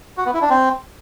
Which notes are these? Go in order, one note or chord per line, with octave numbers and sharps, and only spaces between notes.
F#4
B3
E4
D4
C4